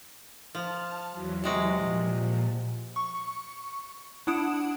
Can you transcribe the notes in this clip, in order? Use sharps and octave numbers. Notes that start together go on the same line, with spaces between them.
F3 A5 F6
E2 E3 F#3
C3 G#3 F#4
A#2 F3
C#6
D4 E4 F#5 D#6 D7 E7